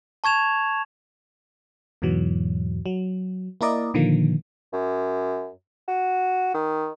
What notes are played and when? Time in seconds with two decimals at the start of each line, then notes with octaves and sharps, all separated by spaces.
0.24 A5 C#6 G#6 E7 F7
2.02 E2 G#2 B2 E3 F#3
2.86 F#3
3.61 A#3 E4 A#4 D5 D#5
3.94 A#2 D3 D#3 F3 A#3
4.73 F#2
5.88 F#4
6.54 D#3